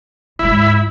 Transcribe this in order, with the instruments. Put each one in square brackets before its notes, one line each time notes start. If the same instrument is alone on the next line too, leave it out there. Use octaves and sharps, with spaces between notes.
[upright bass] D2 G#2 [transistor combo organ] E4